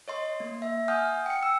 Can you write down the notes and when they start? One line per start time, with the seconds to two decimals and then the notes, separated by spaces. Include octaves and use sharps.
0.08 C#5 D#5 C6
0.40 A#3
0.62 E5
0.88 F#5 G#5 D#6 F6 G6
1.26 G5 C#7
1.43 E6